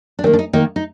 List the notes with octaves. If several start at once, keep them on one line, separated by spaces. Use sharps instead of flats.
D4
D#3 A#3 C4
D4
D#4
D#3 A#3 D#4
D#4